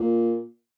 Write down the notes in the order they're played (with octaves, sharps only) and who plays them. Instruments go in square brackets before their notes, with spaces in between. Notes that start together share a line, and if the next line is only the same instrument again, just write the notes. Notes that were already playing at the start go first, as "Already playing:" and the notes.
Already playing: [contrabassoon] A#2